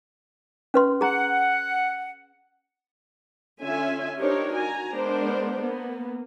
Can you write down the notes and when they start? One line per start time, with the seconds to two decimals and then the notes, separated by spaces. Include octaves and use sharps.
0.74 C#4 B4 C6
1.01 G#4 F#5 A#5
3.61 D3 C#4 F4 E5 G#5
4.19 D4 D#4 G4 A#4 C5 C#5
4.54 F#4 G#5 A#5
4.91 G#3 B3 D4 A#4 C5
5.60 A#3 B3